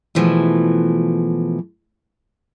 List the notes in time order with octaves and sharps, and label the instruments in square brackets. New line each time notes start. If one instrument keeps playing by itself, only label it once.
[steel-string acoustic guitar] B2 E3 F3 G#3 A3